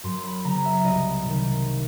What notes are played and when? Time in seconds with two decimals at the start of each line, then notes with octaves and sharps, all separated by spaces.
0.04 F#2 C6
0.24 B5
0.44 C#3 F#3 B3 A#5
0.65 E5
0.84 C2 D#5
1.25 C3 D#3